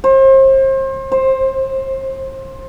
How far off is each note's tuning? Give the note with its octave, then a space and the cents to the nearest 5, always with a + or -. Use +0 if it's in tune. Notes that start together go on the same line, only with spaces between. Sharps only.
C5 +35
C5 +15